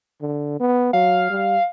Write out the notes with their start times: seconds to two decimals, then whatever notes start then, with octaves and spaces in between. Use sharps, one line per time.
0.21 D3
0.60 B3
0.93 F#3 F5
1.30 G3